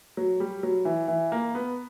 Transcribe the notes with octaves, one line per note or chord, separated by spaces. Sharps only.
F#3
G3
F#3
E3
E3
A#3
B3